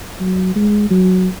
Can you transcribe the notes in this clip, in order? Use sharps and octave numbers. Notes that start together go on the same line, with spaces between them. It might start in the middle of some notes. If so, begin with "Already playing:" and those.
F#3
G#3
F#3